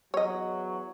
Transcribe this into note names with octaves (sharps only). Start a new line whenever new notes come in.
E2 F#3 C#5 D#5